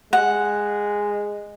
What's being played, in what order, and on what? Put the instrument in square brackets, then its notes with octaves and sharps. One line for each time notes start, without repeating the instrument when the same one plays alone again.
[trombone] G#3 [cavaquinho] F#5